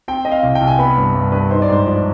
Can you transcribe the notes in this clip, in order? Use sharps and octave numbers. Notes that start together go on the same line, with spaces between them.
C4 G5
C4 D#5
F5
C2
G5
C2
G#5
B3 B5
G2
G2
G2 B4
D#4 C5
D5
G#2 C5
F3 D5